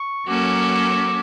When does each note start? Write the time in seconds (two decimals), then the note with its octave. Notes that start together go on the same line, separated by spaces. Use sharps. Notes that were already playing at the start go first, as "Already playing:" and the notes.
Already playing: C#6
0.27 F#3 A#3 C#4 F#4 A4 D6